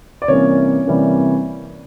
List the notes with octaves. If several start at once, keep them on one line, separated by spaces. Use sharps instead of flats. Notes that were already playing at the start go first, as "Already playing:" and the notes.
D5
C3 E3 G3 A#3 C#4 C#5
C3 E3 G3 A#3 C#4